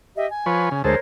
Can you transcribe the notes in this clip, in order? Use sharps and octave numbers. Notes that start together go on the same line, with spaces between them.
G4 D#5 E5
G#5
F3 B4 C#5
C#3
D2 G#3 A4 A#4 C5 C#5